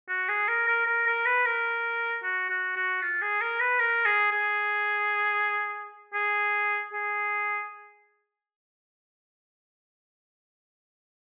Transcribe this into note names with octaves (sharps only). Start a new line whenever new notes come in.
F#4
G#4
A#4
A#4
A#4
A#4
B4
A#4
F#4
F#4
F#4
F4
G#4
A#4
B4
A#4
G#4
G#4
G#4
G#4